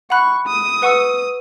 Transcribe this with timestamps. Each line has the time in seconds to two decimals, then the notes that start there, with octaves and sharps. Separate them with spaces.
0.10 F#5 B5 C#6 F#6
0.47 D#6
0.82 B4 F#5 C#6 E6